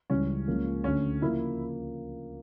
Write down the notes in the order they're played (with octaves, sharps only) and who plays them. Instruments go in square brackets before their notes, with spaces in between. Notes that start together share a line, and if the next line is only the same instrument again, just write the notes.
[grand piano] C#2 C#3 E3 G3 [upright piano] C#4
[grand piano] C#2 C#3 F3 A#3
[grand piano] D2 D3 A3 [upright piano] C#4
[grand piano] C#3 F3 A#3 [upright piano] E4